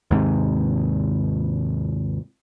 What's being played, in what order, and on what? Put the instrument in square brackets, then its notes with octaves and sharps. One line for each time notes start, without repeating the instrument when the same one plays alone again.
[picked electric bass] D#2 G#2 C3